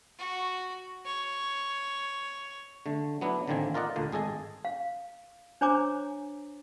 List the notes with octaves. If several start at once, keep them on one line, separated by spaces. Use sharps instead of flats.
F#4
C#5
D3 A3
F#3 B3 D4 E4
A1 D3 D#3 A#3 C4 G#5
F4 A#4 D5 D#5 F#5
D2 A#2 D3
G#1 G#4 A4 D#5 G#5
F5
D4 C5 C#5 G#5 A#5 D6